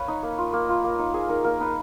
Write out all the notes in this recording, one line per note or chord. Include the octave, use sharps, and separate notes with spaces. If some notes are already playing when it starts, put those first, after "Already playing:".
Already playing: B4 C#5 F5
D#4
A#3
F4
A#3
F4
A#3
D#4
A#3 G#4
D#4 A#4
A#3 A#4
D#4 B4